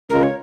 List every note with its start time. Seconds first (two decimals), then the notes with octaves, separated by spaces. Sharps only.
0.10 C#2 C#3 G#3 F4 A#4
0.23 C#5